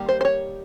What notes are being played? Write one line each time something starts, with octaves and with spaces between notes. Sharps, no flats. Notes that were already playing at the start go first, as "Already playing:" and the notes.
Already playing: D#3 G3 A#3
C5
C5
C#5